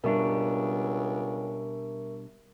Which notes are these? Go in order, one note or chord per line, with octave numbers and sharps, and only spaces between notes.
C#2 B2 G3 D4 A#4 E5 C#6